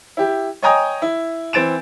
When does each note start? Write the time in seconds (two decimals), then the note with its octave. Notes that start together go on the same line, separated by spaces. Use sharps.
0.17 E4 G4
0.63 C#5 D#5 G5 G#5 A#5 D#6
1.02 E4
1.53 E3 C4 A6 D7 E7